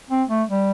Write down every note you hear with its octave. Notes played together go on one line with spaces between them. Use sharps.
C4
A3
G3